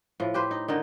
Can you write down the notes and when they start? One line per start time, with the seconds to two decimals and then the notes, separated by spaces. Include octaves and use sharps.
0.20 A2 F3
0.34 G4 B4 C5
0.51 D#4
0.68 D3 D#3 D#4